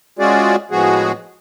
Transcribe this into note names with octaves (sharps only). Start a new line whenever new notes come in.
G#3 C#4 F4 F#4 G#4 D5
A2 F3 G#3 B3 F#4 G#4